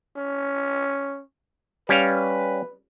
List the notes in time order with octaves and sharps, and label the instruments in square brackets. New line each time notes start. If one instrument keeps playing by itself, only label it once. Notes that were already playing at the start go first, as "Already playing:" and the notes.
[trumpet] C#4
[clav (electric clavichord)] G3 C#4 F5 [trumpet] B4